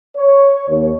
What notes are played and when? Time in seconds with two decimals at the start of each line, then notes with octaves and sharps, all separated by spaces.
0.17 C#5
0.69 D#2